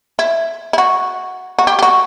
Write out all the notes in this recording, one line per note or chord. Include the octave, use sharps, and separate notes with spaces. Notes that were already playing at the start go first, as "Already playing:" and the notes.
E4
E4
F#4
F#4
G4
G4
F#4